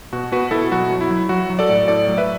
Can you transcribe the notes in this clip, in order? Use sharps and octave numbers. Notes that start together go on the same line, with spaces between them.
B2 F#4
B2 F#4 B4
B2 E4 A4
F#3 F#4
F#3
E4
F#3
F#3 F#4
F#3
A4 D5
A2
A2 A4 D5
F#3
B4 E5